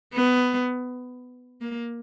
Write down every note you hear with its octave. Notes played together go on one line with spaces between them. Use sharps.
B3
A#3